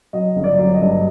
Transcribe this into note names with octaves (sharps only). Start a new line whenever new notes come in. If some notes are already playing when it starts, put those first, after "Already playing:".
F#3 D#5
G1
D5
F#3
D#5
G2